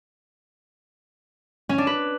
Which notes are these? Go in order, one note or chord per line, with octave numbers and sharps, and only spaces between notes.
C#4
D4
B4